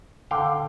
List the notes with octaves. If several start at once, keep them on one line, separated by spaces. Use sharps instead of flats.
D3 F5 G5